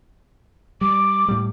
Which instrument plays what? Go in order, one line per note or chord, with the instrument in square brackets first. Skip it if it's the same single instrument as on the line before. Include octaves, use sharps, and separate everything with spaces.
[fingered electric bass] G3 [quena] D6
[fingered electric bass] A2 G3